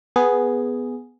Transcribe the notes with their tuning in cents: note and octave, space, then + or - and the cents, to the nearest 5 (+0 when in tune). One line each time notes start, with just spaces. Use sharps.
B3 +0 G#4 +0